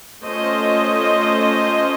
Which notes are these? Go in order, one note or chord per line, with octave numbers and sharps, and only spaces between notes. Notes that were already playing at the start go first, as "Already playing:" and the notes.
A3 C#4 F4 C5 D#5